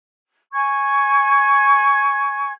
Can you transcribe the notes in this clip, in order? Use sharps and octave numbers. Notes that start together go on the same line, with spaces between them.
G#5 C#6 G#6